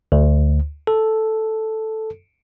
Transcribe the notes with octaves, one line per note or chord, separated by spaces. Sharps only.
D2
A4